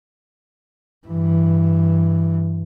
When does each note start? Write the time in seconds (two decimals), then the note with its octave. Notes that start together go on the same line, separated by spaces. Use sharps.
1.07 G2 E3